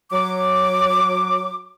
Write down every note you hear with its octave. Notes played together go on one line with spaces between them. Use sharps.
F#3 D6